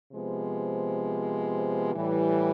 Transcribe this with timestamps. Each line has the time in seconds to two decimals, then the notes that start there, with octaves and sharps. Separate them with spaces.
0.12 C3 F3 G#3 B3
1.94 A2 E3 G3